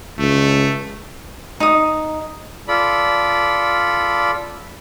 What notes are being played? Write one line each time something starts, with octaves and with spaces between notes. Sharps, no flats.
C#2 A3
D#4 D#6
F4 A4 D5 B5